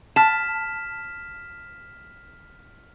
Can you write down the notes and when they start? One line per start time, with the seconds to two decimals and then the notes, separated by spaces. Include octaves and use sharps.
0.16 A5 F6 B6 E7